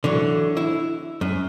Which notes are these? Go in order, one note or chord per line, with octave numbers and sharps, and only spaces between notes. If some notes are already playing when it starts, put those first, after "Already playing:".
D3 E3 F#3
E4
F#2